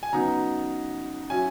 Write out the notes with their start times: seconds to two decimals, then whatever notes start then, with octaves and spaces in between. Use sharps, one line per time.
0.03 G#5
0.13 C#3 F#3 B3 D#4 A#5
1.30 F#3 C#4 E4 G#5